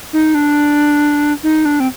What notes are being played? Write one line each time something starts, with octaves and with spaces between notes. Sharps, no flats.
D#4
D4
D#4
D4
C4